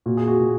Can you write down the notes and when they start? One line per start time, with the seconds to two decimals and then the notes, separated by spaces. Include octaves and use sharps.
0.06 A#2 F#4
0.17 G#4
0.28 F#4
0.40 A#2